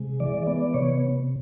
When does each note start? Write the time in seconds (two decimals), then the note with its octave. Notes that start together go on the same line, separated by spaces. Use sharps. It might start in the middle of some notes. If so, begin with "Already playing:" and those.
Already playing: C3 G#3
0.20 E3 D5
0.47 B3 D5
0.74 C3 C#5